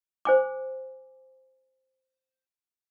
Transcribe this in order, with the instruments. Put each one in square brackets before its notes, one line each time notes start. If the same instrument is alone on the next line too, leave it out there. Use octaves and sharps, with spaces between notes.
[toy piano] C5 G#5 D6